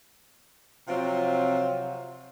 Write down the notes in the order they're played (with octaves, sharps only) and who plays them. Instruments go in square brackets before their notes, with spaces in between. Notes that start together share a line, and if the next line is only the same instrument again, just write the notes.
[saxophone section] C3 F3 F#3 C4 F4